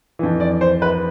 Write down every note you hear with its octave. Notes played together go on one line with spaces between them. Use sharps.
F2 E3
D5
C5
B4